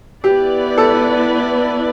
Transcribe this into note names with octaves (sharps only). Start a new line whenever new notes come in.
B3 E4 G4 B4 D5
A4